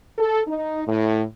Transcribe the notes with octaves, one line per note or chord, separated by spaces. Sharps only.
A4
D#4
A2